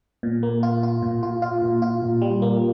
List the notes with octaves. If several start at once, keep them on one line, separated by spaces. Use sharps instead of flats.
A#2
A#3
F4
F4
A#2
F4
F4
A#2
F4
A#2
G3
A#3